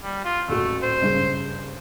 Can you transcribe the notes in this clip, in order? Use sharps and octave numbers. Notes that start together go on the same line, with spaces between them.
G3
F4
D#1 A2 A3 F#4
C5
F#1 G2 C#3